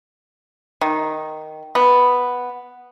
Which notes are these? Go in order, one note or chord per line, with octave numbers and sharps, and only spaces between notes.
D#3
B3